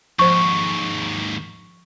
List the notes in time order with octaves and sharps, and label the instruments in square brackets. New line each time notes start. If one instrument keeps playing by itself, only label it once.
[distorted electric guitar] D#2 G#2 [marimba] F3 C5 [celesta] C#6